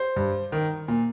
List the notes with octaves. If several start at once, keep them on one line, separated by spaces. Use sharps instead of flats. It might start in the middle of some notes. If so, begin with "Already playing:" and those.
Already playing: C5
G2
D#3
A#2